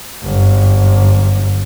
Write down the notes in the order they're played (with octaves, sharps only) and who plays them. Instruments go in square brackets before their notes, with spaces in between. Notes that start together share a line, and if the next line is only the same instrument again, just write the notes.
[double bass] G1 F#2